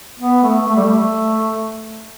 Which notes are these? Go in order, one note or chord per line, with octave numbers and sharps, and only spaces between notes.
B3
A3
A3
G3
A3